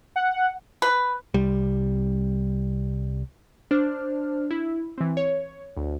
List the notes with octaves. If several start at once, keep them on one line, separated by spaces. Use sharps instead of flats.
F#5
B4
C2 G3
D4 C5 F6
E4
E3 C4
C#5
D2